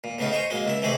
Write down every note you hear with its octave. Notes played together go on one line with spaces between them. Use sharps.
A#2
A2 C#3 B3 D#4 F4
D#4 C5 C#5 G#5
F#3 G#3 A#3
C#2 E4 E5
C3 E3 A3 D#4 G#4 B5